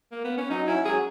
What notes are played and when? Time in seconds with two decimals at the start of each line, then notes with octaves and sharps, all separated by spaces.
0.12 A#3
0.24 B3
0.37 C#4
0.50 F#3 D#4
0.67 C#4 E4
0.85 F#3 G#4